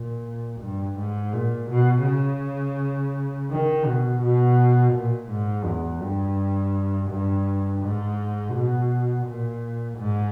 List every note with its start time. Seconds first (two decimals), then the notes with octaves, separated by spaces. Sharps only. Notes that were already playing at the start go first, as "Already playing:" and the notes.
Already playing: A#2
0.61 G2
0.98 G#2
1.33 A#2
1.70 B2
2.06 C#3
3.50 D#3
3.86 B2
4.22 B2
4.93 A#2
5.30 G#2
5.65 E2
6.01 G2
7.10 G2
7.82 G#2
8.54 B2
9.26 A#2
9.98 G#2